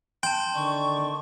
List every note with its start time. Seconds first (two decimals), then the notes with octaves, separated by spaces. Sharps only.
0.23 G5 A5 C6
0.55 D3 D#3 D5 C#6